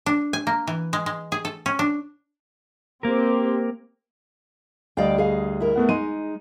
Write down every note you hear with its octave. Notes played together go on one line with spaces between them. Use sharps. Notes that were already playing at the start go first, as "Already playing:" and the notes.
D4
G#5
A#3
E3
G#3
G#3
G#4
A4
C#4
D4
A#3 C4 G4 A#4
D2 G3 D5 D#5 F5 G5
G#4 F5
E4 A#4
A3 B3 F#5
G#3 D#4 D#7